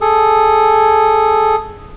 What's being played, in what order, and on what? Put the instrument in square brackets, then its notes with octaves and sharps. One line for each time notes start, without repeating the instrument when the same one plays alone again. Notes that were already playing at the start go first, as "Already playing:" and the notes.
[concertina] G#4 A4